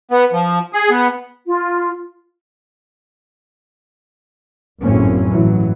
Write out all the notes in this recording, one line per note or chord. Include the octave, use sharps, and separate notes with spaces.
B3
F3
G#4
B3
F4
G#1 F#2 A2 A#3 C4 C#4
A1 G2 E3 F#3